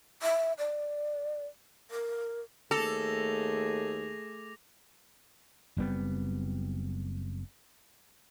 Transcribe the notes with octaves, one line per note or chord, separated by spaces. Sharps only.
E5
D5
A#4
D#2 A3 G#4 A4 D6 A#6 F7
F#1 G3 B3 C4